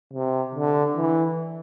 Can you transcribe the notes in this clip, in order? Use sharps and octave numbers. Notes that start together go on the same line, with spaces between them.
C3
D3
E3